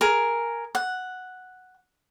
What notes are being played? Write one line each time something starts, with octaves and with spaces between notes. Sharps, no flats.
G#4 A#4
F#5